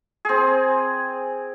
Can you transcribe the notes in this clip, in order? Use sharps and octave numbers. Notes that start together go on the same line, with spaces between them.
C4 G#4